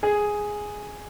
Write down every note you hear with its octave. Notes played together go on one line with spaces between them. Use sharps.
G#4